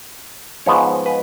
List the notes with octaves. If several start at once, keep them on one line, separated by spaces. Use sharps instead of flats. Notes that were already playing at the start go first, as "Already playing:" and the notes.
G#2 F3 G#3 B3 C#5
B4